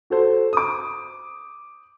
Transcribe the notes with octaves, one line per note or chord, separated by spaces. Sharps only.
F#4 A4 C5
D6 D#6